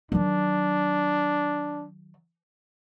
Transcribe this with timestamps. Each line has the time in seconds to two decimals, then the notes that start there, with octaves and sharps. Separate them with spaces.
0.12 D#3 F#3 D4